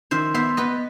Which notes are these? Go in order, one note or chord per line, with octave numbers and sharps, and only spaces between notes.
D#3 C5 E5
B3 C5 E5
B3 B4 D#5